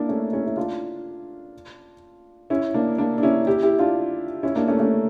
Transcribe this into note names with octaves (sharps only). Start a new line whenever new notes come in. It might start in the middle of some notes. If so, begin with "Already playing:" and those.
Already playing: A#3 D4 E4
A3 C#4
C#4 E4
E4
D4 F4
C#4 E4
A#3 D4
A#3 D4
D4
C#4 E4
E4 G4
E4 G4
D4 F4
C#4 E4
A#3 D4
A3 C#4
A3 C#4